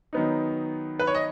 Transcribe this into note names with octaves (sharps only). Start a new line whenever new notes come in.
D#3 F#3 B3 D#4
B4
C#5
D#5